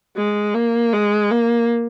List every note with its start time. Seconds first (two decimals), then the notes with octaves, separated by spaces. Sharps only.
0.16 G#3
0.54 A#3
0.93 G#3
1.31 A#3